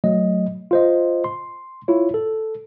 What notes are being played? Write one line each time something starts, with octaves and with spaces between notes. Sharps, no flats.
F#3 A3 D#5
F4 C5 D#5
C6
E4 F4 C#5
A4